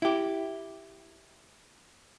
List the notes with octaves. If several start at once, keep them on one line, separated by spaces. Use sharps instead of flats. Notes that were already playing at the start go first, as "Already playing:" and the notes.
E4 G4